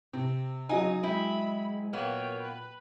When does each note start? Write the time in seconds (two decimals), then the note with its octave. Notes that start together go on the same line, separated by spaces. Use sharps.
0.13 C3 C4
0.69 C#3 F#3 D#4 D#5 G#5
1.03 G#3 C4 E4 B5
1.93 A#2 A#3 B3 C#5 G5
2.43 B4